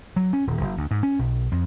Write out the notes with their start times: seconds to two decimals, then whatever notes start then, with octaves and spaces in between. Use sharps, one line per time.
0.16 F#3
0.33 C#4
0.47 D#1
0.61 F#1
0.77 D2
0.91 G#2
1.03 C#4
1.19 B1
1.52 F2